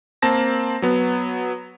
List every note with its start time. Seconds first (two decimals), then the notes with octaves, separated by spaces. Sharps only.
0.22 A#3 C4 A5 A#6
0.82 F#3 B3